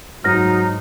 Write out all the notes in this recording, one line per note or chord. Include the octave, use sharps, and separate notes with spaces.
G#2 F#3 D#4 F6 A#6